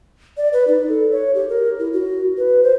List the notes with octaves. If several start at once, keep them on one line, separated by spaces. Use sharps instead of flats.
D5
B4
D#4
A4
C#5
G4
A#4
E4
F#4
B4
C5